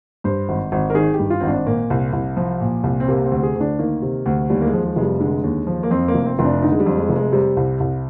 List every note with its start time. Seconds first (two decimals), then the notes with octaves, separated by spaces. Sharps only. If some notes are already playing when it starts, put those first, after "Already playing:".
0.24 G2 C5
0.49 G#1
0.72 G#1
0.90 A#4
0.95 D#3 G#4
1.14 G4
1.19 G2
1.30 F4
1.40 G#1 C4
1.48 D4
1.66 A#2 A#3
1.90 C2
2.13 C2
2.37 F3
2.61 A#2
2.84 C2
3.00 C4
3.08 C3 A#3
3.25 C4
3.32 D2
3.43 G#4
3.55 D2
3.60 D4
3.79 D#3 A#3
4.02 C3
4.26 D2
4.50 D#2 G3
4.61 A#3
4.67 G#3
4.74 F3
4.85 G#3
4.96 F1 G#3
5.02 G3
5.20 D3 G#3
5.44 D#2
5.67 F3
5.83 A#3
5.90 F2 C4
6.08 A#3
6.15 F1
6.26 C4
6.39 F1 C4
6.45 D4
6.62 D3 D#4
6.72 G#3
6.80 G3
6.86 F2
6.98 G#3
7.09 F1
7.16 G#3
7.32 C3 G3
7.57 C2
7.80 C2